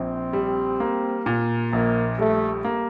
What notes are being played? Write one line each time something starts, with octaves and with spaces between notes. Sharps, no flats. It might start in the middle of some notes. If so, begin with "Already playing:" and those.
Already playing: A#1 C4
G3
A#3
A#2
A#1 A#3
G3 A3
A#3